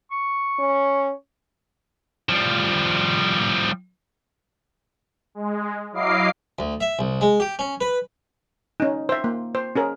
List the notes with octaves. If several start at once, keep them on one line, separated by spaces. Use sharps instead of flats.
C#6
C#4
F3 G3
G#3
F#3 E4 D#5 F5 D6 C7
D2
E5
C2
G#3
G4
C#4
B4
C#4 D#4
C5 E5
A#3
C5
C#4 G#4 A#4